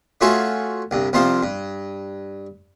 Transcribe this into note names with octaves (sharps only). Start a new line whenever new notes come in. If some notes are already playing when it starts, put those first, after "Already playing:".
A3 C#4 F4 F#4 G#4 A4
C2 G2
C2 C3 F3 F4 C5 D#6
G2